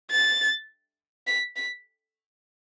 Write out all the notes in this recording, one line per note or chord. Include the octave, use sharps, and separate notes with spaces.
A6
B6
B6